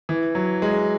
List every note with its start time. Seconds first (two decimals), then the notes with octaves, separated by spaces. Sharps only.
0.09 E3
0.35 F#3
0.62 G#3